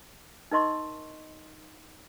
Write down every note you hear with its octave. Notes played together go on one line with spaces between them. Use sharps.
D#4 A#4 D#5 C6 C#6